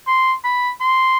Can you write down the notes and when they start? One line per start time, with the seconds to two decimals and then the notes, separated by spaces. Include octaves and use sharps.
0.07 C6
0.44 B5
0.80 C6